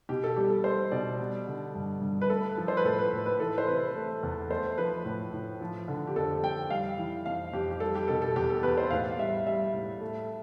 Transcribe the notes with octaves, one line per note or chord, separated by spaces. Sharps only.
B2 G4
A4
G3 G4
A4
G3 C5
B2 D5
G3
D3
G2
G2
B4
A3 A4
F3
C5
B4
A2 A4
B4
A2
B4
E3 A4
C5
C3 B4
A3
E2
A3 C5
F3 B4
A2
A2
F3
D3
G4
F2 A4
F2 G5
G3 F5
E3
F2 F5
F2 G4
G4
G3 A4
G4
B2 A4
A4
E2 G4
A4
E2 B4
C5
A2 F5
G3 E5
G3 E5
A2
A3